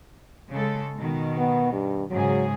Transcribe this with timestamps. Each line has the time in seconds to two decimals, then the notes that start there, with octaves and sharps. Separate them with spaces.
0.50 C#3 G#3 A4
0.97 B2 D#3
1.37 B3
1.72 G2
2.10 G#2 C#3 F#3 G#4